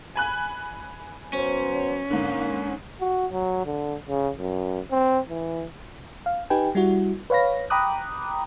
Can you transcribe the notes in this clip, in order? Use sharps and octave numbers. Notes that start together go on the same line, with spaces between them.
G#5 B5 F#6
F#3 B3 C#4 C5
G#2 D3 A#3
F#4
F#3
D3
C#3
F#2
C4
E3
F5
D#4 G4 B4 G5 G#5
G3 E4 F#4
B4 C#5 F5 B5 A#6
G5 A#5 B5 D6 D#6 F#6